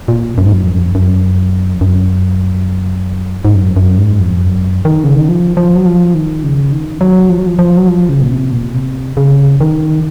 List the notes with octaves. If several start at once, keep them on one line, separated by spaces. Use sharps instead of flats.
A#2
F#2
G#2
F#2
F2
F#2
F2
F#2
G#2
F#2
F#2
G#2
F2
F#2
D#3
C#3
D#3
F3
F3
F#3
F3
D#3
C#3
D#3
F#3
F3
F#3
F3
F3
F#3
F3
C#3
A#2
C3
A#2
C3
C#3
D#3